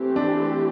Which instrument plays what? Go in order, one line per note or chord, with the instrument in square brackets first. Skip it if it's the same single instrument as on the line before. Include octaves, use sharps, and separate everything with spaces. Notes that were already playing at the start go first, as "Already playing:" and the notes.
Already playing: [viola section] E3 A3 C4 G4
[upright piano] D4